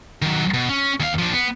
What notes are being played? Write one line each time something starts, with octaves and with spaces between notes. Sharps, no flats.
D#3 F#3
B2
C#4
D#2 F5
F3 D4
B3